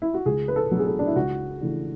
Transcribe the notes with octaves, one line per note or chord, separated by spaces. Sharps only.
E4
F#4
C#2 G#4
B4
A4
B2 F#3 A3 D4
G#4
A4
D4
E4
C#2 F#4
C#3 E3 A3 D4